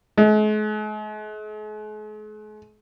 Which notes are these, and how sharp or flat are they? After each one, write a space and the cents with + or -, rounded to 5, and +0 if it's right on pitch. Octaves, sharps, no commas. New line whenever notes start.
G#3 +45